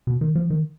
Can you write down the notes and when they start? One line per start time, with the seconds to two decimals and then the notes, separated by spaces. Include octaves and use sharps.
0.07 B2
0.21 D#3
0.35 F3
0.50 D#3